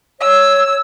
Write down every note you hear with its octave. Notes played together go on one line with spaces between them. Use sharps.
C#5 E6